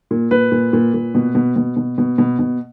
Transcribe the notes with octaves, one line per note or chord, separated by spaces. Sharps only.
A#2
A#2 B4
A#2
A#2
A#2
B2
B2
B2
B2
B2
B2
B2